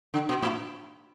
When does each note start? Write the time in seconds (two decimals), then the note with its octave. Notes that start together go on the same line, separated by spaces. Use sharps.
0.14 D3
0.29 B2
0.42 A2